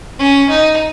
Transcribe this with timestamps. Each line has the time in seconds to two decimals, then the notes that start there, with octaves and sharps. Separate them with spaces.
0.19 C#4
0.49 D#4